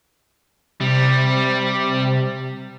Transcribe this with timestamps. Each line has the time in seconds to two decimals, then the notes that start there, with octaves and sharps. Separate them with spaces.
0.80 C3 G3